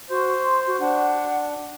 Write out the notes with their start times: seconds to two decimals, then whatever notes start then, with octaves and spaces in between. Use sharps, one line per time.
0.10 F#4 C5
0.45 C6
0.67 F#4
0.80 D4 F#5